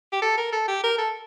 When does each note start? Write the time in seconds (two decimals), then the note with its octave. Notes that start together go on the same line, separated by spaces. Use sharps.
0.13 G4
0.22 A4
0.38 A#4
0.52 A4
0.68 G4
0.84 A#4
0.98 A4